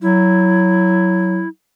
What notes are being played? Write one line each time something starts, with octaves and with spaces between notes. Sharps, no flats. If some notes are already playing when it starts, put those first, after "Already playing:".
F#3 E4